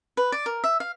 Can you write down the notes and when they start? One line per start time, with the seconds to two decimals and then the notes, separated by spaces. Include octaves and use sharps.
0.17 B4
0.32 D5
0.46 A#4
0.64 E5
0.80 F5